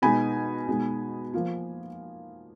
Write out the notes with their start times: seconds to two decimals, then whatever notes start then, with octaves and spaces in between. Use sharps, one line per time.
0.02 B2 G#3 B3 D#4 G#5 B5
0.68 B2 G#3 D#4
1.34 F3 A#3 F4